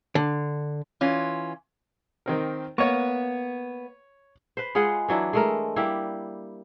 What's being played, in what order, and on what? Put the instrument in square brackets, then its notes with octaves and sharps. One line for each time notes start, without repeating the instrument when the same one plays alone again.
[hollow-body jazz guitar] D3
[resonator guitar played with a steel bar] E3 C#4 F4
[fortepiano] D#3 C4 A#4
[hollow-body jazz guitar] A#3 B3 [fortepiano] C#5 C#6
[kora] B4 C5
G#3 F4 G#4 F#5
E3 F#3 D4 E4
G#3 A3 A#4
G3 A#3 E4 G4